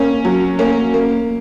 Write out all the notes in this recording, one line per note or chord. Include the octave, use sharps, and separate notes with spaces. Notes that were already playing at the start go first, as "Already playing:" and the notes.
Already playing: A#3 C#4
F#3
A#3 C#4
A#3